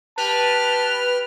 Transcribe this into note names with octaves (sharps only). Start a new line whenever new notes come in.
G4 B4 A5 F6